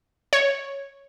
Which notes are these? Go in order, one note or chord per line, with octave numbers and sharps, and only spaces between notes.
C#5